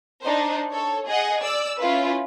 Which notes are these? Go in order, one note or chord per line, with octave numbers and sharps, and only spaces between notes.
D4 D#4 C5
A4 C#5
G#4 D#5 F#5
D5 E6
C#4 E4 F4 B4